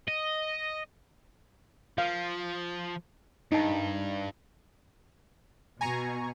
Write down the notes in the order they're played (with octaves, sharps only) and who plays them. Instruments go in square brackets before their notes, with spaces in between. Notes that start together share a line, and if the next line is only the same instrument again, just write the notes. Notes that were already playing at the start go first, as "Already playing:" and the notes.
[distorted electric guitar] D#5
[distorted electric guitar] F3 [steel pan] F5
[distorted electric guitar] G2 [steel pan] D#4 A5
[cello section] B2 [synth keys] G#5 A#5 C#6